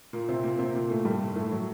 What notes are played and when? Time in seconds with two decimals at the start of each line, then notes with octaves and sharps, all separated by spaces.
0.13 A#2 A#3
0.29 C3 C4
0.43 A#2 A#3
0.59 C3 C4
0.75 A#2 A#3
0.90 A2 A3
1.05 G2 G3
1.36 A2 A3
1.52 F#3